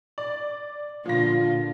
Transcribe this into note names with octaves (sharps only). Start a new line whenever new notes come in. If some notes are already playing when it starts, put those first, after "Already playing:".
D5
A#2 D3 F3 F4 A#6